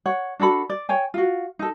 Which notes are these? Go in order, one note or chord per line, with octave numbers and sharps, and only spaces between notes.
C#5 F#5
D4 F#4 A4 B5
D5
C#5 G5 G#5
F4 F#4
D#4 A4